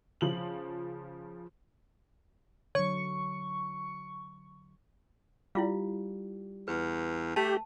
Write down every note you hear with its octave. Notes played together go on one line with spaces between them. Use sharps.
C#3 F3 F#7
D3 F#3 C#5 C#6
G3 E4 F4 F5
E2 B4
A3 G4 A5